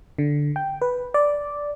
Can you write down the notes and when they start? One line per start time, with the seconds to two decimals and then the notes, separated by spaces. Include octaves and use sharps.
0.18 D3
0.56 G5
0.82 B4
1.14 D5